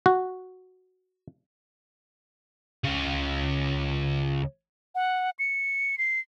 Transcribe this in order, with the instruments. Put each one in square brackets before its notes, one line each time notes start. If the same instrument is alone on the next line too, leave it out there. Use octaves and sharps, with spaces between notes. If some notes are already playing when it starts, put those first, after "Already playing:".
[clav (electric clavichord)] F#4
[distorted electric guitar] C#2 C#3
[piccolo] F#5
C#7
C7